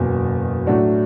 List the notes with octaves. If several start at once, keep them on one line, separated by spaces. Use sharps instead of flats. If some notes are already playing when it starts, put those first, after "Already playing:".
Already playing: F#1 E2 B2
A2 F#3 A3 D4 F#4